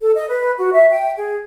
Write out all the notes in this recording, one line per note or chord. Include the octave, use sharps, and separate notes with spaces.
A4
D#5
B4
F#4
E5
G5
G#4